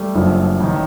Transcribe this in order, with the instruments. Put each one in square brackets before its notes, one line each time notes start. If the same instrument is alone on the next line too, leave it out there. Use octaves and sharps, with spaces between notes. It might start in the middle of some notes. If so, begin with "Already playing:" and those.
Already playing: [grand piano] G3 A3
F#1 F#2 D3 F3
A1 D#3